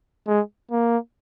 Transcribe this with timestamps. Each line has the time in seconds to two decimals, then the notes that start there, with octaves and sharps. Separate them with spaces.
0.27 G#3
0.71 A#3